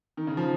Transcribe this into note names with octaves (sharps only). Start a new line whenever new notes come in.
D#3
C#3
F3